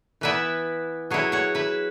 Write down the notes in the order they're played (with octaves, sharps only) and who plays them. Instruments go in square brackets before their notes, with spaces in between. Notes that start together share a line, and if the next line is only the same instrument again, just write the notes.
[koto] E3 B3 E4 B4 E5
F#3 E4 G#4 C#5
C#5 F#5
B4 E5